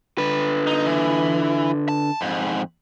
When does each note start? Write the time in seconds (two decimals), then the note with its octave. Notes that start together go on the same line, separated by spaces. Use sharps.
0.18 D3 B4
0.67 D#4
0.86 E3
1.89 A5
2.21 F2 G#2